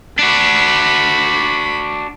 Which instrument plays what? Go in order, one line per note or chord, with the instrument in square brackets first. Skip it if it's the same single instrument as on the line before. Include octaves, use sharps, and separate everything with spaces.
[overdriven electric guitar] D4 F#4 [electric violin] B5